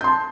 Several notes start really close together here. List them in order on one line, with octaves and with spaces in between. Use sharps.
G6 C6 A5